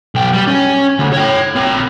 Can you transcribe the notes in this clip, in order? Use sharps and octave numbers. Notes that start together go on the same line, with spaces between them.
B1 G5
G3 G4
C#4
D2
C#5 G5
C4 A#4